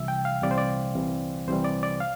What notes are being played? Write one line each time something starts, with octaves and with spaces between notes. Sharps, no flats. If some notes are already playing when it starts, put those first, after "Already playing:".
Already playing: C2 C3 E3 G3 E5
G5
F5
C2 C3 E3 G3 D5
C5
D5
C2 C3 E3 G3
C2 C3 E3 G3 C5
D5
D5
F5